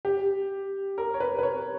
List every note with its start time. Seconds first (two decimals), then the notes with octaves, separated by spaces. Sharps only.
0.05 G4
0.98 A#4
1.14 C#5
1.20 B4
1.39 B4
1.43 C#5